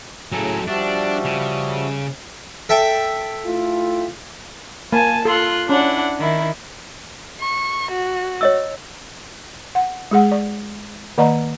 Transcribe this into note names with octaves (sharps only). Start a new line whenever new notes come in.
A2 C#3 F#3 A4 G#5 A#5
F3 G3 D4 F#4 E5
C#3
A4 E5 G5
A3 E4 F4
A#3 G#5 A5
F4 A4 C6 F#6
C#4 D4 E4 F#5
D#3 E4
C#6
F#4
C#5 D#5 E6
F#5
G#3 G#4 F#5
D5
D#3 A#3 D5 D#5 A#5